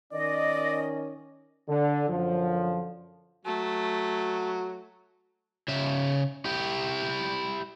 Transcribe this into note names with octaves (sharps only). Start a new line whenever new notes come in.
D#3 C#4 D5 D#5
D3
F#2 D3 F3
F#3 A3
C#3 E5
E4 G4